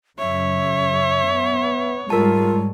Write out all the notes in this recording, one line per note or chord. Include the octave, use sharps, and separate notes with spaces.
F#2 C#3 C#5 E5
B3
G#2 G3 G#3 F4 A#4 A5